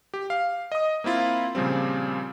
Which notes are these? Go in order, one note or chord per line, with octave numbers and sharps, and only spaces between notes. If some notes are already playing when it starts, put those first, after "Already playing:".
G4
F5
D#5 D#6
A#3 C4 E4 F4
A#2 C#3 F3 G3 C4